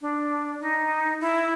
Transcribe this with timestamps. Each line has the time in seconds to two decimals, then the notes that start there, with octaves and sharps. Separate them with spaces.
0.01 D4
0.61 D#4
1.21 E4